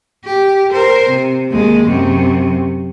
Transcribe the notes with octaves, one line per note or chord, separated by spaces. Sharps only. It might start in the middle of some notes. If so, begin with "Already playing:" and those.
G4
A#4 C5
C3
D#2 G#3
F#2 C3